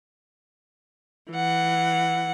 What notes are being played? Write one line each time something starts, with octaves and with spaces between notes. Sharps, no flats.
E3 F#5